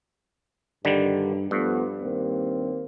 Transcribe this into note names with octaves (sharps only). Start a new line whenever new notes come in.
G2 D3 D#3 G3
G2 F3 A3 B3
D#2 A#3 C4